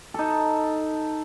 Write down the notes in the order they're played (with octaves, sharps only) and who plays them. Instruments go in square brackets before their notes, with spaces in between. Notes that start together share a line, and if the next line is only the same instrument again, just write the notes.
[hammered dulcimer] D#4 A4